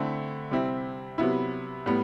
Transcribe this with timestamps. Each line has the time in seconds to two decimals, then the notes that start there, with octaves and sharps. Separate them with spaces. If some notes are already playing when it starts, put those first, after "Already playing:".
Already playing: D3 A3 C4 E4
0.51 C3 G3 C4 E4
1.18 C3 F#3 B3 E4
1.86 A2 G3 B3